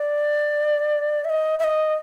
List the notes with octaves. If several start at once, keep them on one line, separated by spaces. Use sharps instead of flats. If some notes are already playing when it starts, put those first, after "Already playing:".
Already playing: D5
E5
D#5
E5
D#5